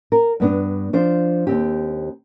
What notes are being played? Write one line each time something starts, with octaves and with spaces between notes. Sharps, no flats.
A#4
G2 B3 D4
F3 D4 C5
D#2 C4 G4